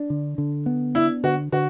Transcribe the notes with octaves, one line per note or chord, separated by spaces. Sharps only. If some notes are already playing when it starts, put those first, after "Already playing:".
Already playing: D4
D3
D3
B3
D4 E4
D3 F#4
D3 F#4